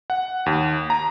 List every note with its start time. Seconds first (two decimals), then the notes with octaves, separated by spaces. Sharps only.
0.10 F#5
0.46 D#2
0.90 A#5